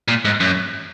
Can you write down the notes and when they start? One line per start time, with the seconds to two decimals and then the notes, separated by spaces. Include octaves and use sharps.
0.08 A#2
0.25 G#2
0.40 F#2